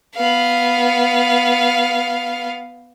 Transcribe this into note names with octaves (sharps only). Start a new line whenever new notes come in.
B3 F5